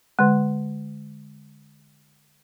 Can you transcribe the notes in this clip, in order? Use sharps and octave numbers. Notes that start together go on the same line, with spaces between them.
D3 G#3